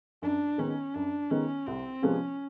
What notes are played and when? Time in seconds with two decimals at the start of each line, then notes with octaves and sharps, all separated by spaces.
0.22 F#2 D4
0.58 D#3 G#3 B3 C#4 D#4
0.94 F#2 D4
1.31 D#3 G#3 B3 C#4 D#4
1.67 C2 C4
2.02 C3 F3 G#3 B3 C#4